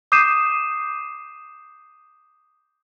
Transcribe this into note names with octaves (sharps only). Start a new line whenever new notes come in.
D6 D#6 G6 C7 D#7 E7